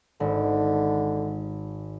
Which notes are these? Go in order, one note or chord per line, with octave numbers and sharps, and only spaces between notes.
G#1 D3